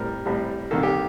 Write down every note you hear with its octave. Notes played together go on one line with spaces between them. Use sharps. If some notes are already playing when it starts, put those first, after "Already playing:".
Already playing: A1 A2 G3 C4 A#4
A1 A2 G3 C4
C2 C3 D#3 A#3 A4
G4